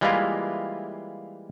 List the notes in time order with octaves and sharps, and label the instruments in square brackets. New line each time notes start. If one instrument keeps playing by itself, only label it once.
[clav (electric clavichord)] E3 G3 G#3 A#3 E4 F4